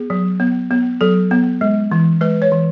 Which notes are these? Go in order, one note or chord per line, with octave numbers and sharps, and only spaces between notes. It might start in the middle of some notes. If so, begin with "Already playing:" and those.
Already playing: B3 G#4
F#3
B3
B3
F#3 A4
B3
G#3
E3
G#3 B4
C#5
E3